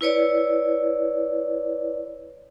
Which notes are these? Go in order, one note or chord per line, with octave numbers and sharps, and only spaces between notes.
E4 B4 C#5 D5